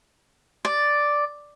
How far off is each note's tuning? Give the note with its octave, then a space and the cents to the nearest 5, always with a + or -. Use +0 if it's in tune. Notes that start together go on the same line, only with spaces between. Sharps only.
D5 +0